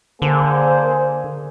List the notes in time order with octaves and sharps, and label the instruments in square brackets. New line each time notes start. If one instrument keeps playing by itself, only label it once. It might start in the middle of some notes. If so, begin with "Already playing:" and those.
[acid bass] D3 [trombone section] A#3 G#4 C5